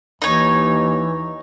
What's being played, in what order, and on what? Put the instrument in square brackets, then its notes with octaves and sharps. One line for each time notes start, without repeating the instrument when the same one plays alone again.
[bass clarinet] D#2 [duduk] E3 [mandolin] D#4 C#5